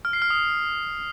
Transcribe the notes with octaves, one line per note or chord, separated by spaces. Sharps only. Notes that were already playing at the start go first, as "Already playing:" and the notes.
F6
C7
F6
D#6